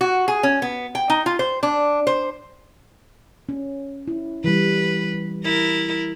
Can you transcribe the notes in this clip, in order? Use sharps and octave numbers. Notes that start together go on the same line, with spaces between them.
F#4
G#4
C#4
B3
G5
D#4
F4
C5
D4
C5
C#4
E4
E3 G3 B4
E4 A#4